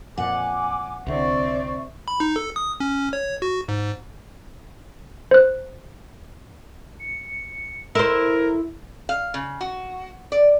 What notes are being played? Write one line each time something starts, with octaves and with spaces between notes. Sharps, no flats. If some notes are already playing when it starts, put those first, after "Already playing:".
F2 A#2 F#5 G#5 D6
C2 D3 C4 D5 E5 C#6
B5
D#4
A4
D#6
C#4
C#5
F#4
G#2
C5 F#6
C#7
E4 A4 A#4 C5
F5
C#3
F#4
D5